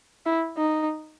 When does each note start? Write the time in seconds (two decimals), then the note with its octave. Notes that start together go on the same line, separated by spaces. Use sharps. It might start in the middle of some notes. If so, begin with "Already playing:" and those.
0.26 E4
0.57 D#4